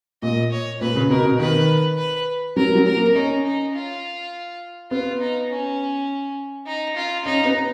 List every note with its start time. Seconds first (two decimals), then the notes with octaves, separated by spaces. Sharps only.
0.22 A#2 D#5
0.52 C#5
0.81 A#2 B4
0.95 C#3
1.10 B2 A#4
1.25 B2
1.39 D#3 B4
1.98 B4
2.56 F#3 A#4
2.76 F#3
2.86 A#4
2.96 A#3
3.15 C#4 D#4
3.45 D#4
3.74 F4
4.91 B3 F4
5.20 D#4
5.49 C#4
6.67 D#4
6.96 F4
7.25 C#4 D#4
7.45 B3